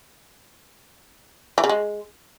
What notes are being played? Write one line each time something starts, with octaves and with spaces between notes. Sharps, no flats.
E3
C#3
G#3